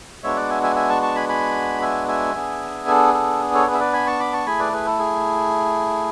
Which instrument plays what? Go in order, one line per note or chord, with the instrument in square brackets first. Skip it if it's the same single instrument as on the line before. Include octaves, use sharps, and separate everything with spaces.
[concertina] G#3 B3 D4 F#4 C#5 E5
D5 F#5
E5 G#5
E5 G#5
E5 G#5
A5 C#6
A5 C#6
G#5 B5
G#5 B5
E5 G#5
E5 G#5
B3 D4 G#4
A4
A4
A4 C#5
G#4 B4
E5
B4 D5
G#5 B5
A5 C#6
B5 D6
A5 C#6
A3 E4 G#4 G#5 B5
B4 D5
G#4 B4
A4
G#4